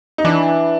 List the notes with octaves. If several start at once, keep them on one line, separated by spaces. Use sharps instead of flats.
D#4
E3 D4